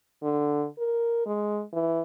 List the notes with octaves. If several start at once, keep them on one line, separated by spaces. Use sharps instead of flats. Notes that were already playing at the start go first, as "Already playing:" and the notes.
D3
A#4
G#3
E3